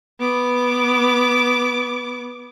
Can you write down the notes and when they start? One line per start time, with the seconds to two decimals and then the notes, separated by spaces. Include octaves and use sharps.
0.20 B3 D6